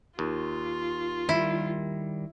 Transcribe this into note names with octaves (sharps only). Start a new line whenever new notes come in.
D#2 F4
D#3 G3 E4